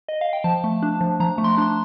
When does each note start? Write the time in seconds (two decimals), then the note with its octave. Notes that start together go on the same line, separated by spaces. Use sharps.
0.08 D#5
0.21 F5
0.33 G5
0.44 F3 A5
0.64 A3
0.83 D4
1.01 F3
1.20 F3 A#5
1.38 A3
1.44 C6
1.58 D4 C6